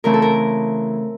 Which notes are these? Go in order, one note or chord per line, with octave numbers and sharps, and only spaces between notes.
C#3 E3 A3 C4 A#4
A4
A#4